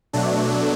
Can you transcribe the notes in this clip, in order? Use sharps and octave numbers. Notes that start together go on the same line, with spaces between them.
B2 F#3 A3 D4